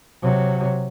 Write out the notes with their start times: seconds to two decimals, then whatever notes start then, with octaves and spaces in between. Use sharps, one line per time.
0.22 C3 F#3